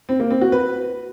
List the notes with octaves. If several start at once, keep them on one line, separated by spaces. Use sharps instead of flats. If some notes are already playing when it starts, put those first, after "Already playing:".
C4
A#3
C4
F#4
B4